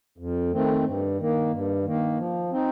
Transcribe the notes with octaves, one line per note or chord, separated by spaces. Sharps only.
F2
D#3 A3 C4
G2
D#3 A#3
G2
D#3 A#3
F3
C4 D#4